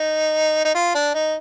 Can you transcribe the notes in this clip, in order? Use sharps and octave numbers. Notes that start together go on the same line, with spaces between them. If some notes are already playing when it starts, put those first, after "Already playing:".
Already playing: D#4
D#4
F4
D4
D#4